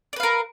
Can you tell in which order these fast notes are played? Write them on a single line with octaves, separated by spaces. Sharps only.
D5 B4 F5 A#4